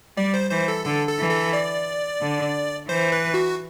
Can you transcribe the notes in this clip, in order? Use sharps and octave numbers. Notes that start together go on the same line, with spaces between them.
G3 D5
C5
E3 C5
A4
D3 A4
A4
E3
A4
D5
D3
E3 C5
B4
F#4